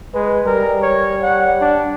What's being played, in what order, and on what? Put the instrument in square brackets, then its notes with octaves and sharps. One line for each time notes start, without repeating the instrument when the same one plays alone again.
[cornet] G#3 [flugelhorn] B4
[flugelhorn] G3 [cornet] A#4
[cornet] C#5
F#5
D4